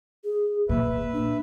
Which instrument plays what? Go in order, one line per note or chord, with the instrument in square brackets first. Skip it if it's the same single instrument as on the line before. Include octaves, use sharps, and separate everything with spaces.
[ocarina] G#4
[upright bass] A#2 [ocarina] A#3 [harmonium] B4 E5
[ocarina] D4